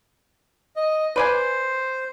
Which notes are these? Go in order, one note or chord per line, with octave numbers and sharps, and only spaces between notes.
D#5
B4 C5 D5 G#5